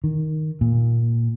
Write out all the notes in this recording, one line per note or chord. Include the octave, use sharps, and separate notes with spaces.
D#3
A#2